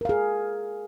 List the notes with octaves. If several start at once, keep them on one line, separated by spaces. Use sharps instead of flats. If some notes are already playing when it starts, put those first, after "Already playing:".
G#4 A#4 F5